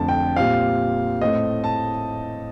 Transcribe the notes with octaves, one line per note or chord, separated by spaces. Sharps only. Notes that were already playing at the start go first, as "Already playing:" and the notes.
Already playing: F2 D3 A3 A5
G5
A#2 G3 C4 F5
A2 A3 C4 D#5
A5